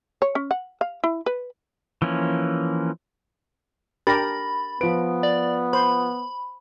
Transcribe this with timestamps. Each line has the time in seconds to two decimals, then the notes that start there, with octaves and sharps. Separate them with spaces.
0.22 C#5
0.35 C#4
0.51 F#5
0.81 F5
1.04 E4
1.26 B4
2.02 E3 F3 A#3 C#4
4.07 D4 G4 A#4 B5 A6 A#6
4.81 F3 B3 B4 D7
5.23 D5
5.73 C5 B5